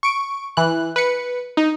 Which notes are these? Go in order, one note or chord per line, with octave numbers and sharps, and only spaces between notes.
C#6 D7
E3 F#6
B4 C#7
D#4